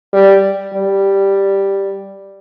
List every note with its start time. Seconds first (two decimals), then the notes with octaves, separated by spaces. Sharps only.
0.13 G3
0.74 G3